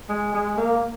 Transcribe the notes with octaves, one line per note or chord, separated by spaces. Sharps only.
G#3
G#3
A#3